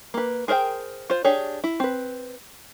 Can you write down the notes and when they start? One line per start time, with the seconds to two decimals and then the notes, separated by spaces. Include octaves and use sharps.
0.14 A#3 B4
0.48 G#4 A#4 C5 E5 G5
1.10 F4 C5
1.25 D4 G4 G#4 C#5
1.64 E4
1.80 C4 B4